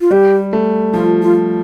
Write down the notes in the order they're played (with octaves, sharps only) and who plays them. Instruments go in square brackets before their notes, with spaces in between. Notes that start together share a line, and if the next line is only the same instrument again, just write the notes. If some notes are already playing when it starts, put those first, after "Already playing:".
[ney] F4
[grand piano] G3 [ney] G4
[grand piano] A3
[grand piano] F3 [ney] F4
[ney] F4